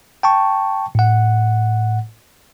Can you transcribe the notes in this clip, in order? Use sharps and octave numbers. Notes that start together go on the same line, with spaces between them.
G5 A5 C#6
A2 F#5